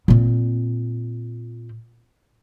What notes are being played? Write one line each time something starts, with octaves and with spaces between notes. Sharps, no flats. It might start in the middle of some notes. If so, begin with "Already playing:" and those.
A#2 C4